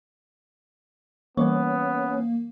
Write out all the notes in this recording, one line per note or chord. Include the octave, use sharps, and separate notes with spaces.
E3 G3 A#3 B3 C#4 B4